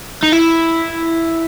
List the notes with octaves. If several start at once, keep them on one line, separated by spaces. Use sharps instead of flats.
D#4
E4